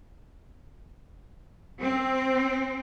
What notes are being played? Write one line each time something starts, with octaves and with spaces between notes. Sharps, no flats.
C4